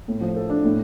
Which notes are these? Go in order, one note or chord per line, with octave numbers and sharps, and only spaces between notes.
A2
F3
A4
D4
A2